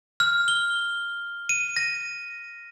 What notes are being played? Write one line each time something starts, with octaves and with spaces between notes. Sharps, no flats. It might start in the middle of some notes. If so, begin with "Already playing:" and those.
F6
G7
D#7
A#6